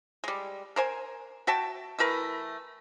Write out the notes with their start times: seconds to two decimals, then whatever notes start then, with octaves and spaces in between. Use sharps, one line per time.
0.24 G3 G#3
0.76 A#4 C5 G#5
1.47 F#4 E5 G5 A5
1.99 E3 A3 A#4 B4